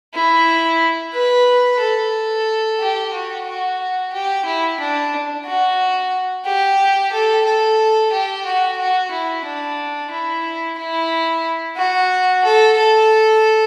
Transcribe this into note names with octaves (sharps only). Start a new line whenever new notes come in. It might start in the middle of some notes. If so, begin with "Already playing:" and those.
E4
B4
A4
G4
F#4
F#4
G4
E4
D4
F#4
G4
A4
A4
G4
F#4
F#4
E4
D4
E4
E4
F#4
A4
A4